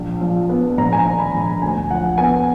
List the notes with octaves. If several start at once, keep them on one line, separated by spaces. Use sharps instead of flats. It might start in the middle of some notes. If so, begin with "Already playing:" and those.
Already playing: A#1
F3
B3
A#1 A#5
G#5
A#5
D#3
B5
A#1
A#5
D2 G#5
F3 F#5
B3 G#5